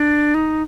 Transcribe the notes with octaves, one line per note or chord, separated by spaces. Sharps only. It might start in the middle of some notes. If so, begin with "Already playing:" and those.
Already playing: D4
D#4